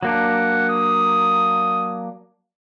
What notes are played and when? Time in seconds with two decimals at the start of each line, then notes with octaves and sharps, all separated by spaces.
0.03 F#3 A#3 D4 F#5
0.69 D#6